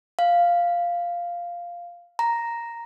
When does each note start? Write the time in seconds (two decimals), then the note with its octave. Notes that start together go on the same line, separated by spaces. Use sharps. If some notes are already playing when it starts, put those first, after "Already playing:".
0.19 F5
2.19 A#5